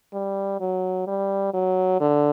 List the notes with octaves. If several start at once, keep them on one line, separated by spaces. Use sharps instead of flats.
G3
F#3
G3
F#3
D3